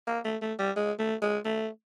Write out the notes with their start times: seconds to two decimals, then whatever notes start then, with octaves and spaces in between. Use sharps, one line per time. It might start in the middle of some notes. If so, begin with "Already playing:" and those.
0.07 A#3
0.25 A3
0.42 A3
0.59 G3
0.76 G#3
0.99 A3
1.22 G#3
1.45 A3